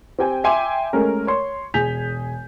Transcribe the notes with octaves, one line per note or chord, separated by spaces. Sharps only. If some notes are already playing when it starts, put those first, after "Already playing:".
C4 G4 G5 G#5
E5 G5 G#5 C6 D6
G#3 A3 C#4 A#4
C#5 C6
E1 G#4 G#5 G6 B6 F7